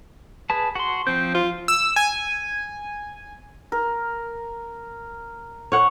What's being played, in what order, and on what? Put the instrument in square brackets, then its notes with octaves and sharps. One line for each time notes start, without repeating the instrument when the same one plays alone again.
[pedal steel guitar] G#4 B4 A5
F#4 C6
[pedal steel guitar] F3 G6 [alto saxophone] C4
[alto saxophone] F4
[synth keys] E6
G#5
[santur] A#4
[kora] C#5 F#5